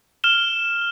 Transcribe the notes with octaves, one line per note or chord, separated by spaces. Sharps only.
F6 E7 G7